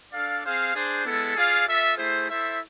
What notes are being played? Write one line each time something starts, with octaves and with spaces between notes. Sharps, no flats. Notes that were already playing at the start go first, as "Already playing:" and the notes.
D4 A4 D5 F5
C4 G#4 C5 F5
D4 G#4 C5
G#3 B3 E4 A4
F4 G#4 D5 F5
F4 A4 E5
A3 E4 G#4 C5
E4 A4 C5 E5